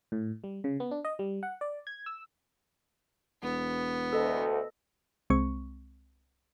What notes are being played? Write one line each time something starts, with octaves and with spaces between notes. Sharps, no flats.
A2
G3
C#3
B3
D4
D#5
G3
F#5
D5
G#6
E6
E1 B3
D2 A4 D#5
C2 G#3 C4 C#6